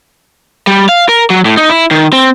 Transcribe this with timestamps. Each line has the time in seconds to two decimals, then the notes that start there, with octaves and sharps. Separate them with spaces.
0.67 G3
0.89 F5
1.09 A#4
1.30 F#3
1.45 A2
1.57 D#4
1.70 E4
1.91 D#3
2.13 C4